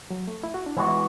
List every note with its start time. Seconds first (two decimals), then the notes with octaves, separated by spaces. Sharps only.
0.10 F#3
0.27 A3
0.43 E4
0.54 F#4
0.66 D4
0.77 E3 G#3 B3 E4 F#4
0.88 E4